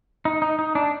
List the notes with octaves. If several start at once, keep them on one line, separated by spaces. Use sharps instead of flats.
D#4
D#4
D#4
D4